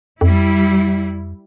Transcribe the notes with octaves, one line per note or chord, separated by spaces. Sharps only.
F2 G3 E4